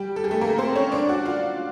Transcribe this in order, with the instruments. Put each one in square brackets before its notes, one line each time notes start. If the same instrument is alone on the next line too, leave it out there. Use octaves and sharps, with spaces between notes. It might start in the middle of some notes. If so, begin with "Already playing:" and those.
Already playing: [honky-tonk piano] G3 G4
A4
G#4
A3 A4
A#3 A#4
C4 C5
C#4 C#5
D4 D5
F#4 F#5
F4 F5